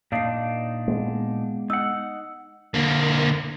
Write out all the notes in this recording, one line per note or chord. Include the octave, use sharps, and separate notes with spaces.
A#2 D4 D#4 F5 C7
G#3 B3
D#4 F#5 E6
D3 A#3